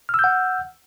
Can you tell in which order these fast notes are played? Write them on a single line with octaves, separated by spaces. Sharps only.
F6 E6 G6 F#5